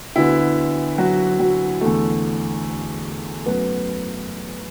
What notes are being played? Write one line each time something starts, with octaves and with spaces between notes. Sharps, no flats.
D2 D3 B3 E4
F#3 F#4
F#3 F#4
E2 D3 A3 A4
F#2 F#3 A3 B3 B4